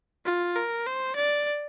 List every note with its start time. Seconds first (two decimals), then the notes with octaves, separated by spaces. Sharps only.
0.25 F4
0.56 A#4
0.87 C5
1.16 D5